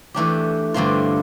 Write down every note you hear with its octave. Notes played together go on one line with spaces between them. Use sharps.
E3 A3 D4 G4
G2 D3 A3 C4 F4